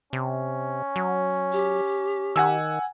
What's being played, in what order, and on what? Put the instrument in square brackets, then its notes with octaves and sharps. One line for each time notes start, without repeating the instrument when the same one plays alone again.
[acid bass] C3 [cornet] C#4
[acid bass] F#3
[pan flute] G4
[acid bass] D#3 [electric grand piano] F#5 G#5 E6